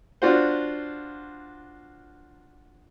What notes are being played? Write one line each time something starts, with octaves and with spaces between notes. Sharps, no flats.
D4 F4 F#4 C5